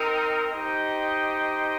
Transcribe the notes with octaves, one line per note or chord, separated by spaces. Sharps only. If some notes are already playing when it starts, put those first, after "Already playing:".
Already playing: C4 D#4 A#4
D#4 G4 C5 D#5 G5